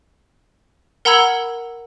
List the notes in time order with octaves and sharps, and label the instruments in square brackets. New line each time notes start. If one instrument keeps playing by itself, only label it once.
[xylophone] A#4 F#5 A#5 B5 E6 G#6